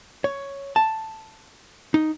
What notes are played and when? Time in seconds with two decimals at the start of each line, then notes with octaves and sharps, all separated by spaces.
0.24 C#5
0.76 A5
1.94 D#4